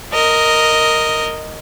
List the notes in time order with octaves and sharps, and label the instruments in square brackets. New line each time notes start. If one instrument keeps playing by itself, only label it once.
[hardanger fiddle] A#4 D#5